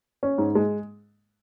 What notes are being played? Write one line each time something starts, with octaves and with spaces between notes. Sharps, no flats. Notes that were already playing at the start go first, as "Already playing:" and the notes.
C#4
G#2
G#3